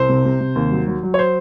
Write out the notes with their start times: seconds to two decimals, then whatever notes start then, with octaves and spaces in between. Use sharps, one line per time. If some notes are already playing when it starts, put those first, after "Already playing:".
Already playing: C2 C5
0.09 C3
0.25 C3
0.41 C3
0.56 D#2
0.71 F#3
0.87 F#3
1.03 F#3
1.14 C#5
1.19 C5